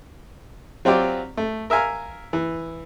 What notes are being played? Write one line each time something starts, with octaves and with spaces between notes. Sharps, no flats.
F#3 C4 F4 G4 D5
A3
A#4 E5 F5 G#5 A#5
E3